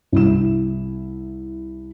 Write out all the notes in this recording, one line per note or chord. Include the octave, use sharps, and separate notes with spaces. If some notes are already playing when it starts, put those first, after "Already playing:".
C2 E4 E7